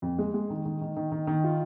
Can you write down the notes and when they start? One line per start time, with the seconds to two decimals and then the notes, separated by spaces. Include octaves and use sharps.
0.02 F2
0.18 G#3
0.34 G#3
0.50 D#3
0.65 D#3
0.81 D#3
0.97 D#3
1.12 D#3
1.27 D#3
1.44 F4